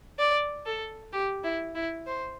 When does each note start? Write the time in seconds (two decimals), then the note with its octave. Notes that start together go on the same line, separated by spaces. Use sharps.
0.19 D5
0.66 A4
1.13 G4
1.44 E4
1.75 E4
2.07 C5